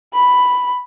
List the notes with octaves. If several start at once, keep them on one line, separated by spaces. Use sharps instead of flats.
B5